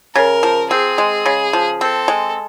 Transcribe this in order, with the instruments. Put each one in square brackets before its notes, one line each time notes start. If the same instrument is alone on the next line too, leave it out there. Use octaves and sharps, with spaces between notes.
[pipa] C#3 [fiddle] A#4
[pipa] F3
[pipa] C4 [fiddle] G#4
[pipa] G#3
C#3
F3
[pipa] C4 [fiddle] A4
[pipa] G#3